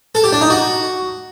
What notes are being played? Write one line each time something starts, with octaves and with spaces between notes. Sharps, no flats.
A4
G4
D4
D#4
F#4